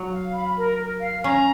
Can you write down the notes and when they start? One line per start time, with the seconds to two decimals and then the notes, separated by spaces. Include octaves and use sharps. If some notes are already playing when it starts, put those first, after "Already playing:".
Already playing: F#3
0.12 F5
0.34 B5
0.57 A#4
0.79 A#4
1.01 F5
1.24 C#4 A#5